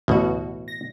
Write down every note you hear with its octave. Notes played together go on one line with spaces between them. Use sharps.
A1 D2 B2 F#4
A#6